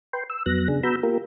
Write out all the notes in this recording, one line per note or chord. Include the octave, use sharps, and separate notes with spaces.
B4 G5 C6
E6
F2 F#3 B3 F#6 A#6
C#3 D4 G#4
B3 F#4 A#5 B5 E6 G6
A#3 F4 G4 A#4